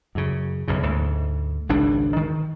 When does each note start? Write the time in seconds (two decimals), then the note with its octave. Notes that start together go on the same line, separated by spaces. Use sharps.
0.15 F#2 C#3
0.68 B1 F#2 C#3
0.83 D2 G#2
1.69 G#1 C#2 D4
2.16 D#3